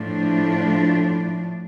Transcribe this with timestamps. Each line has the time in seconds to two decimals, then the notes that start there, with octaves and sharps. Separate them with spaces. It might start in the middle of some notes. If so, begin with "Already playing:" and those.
Already playing: A2 F3 A3 D4